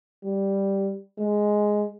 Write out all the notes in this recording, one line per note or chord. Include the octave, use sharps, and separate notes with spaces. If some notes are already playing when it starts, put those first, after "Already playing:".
G3
G#3